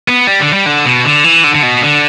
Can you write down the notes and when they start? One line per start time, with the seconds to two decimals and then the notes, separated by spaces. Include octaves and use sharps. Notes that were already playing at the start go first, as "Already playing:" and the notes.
0.08 B3
0.27 G3
0.41 D3
0.53 G3
0.66 D3
0.85 B2
1.04 D3
1.24 E3
1.44 D3
1.55 D3
1.63 B2
1.82 D3